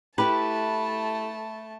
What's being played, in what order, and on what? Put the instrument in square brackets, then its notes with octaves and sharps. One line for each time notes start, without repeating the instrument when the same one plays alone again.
[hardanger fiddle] A3 A5 [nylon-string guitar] E4 G4 [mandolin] B4